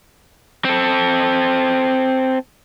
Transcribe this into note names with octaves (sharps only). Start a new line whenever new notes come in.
C4 A4